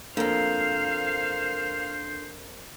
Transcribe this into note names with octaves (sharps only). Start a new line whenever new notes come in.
F2 A#3 D4 A4 A#4 C5 F5